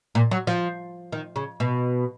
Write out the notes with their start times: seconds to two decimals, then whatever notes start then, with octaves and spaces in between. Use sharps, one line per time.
0.15 A#2
0.31 F#3
0.47 F3
1.12 D#3
1.36 C#3
1.60 B2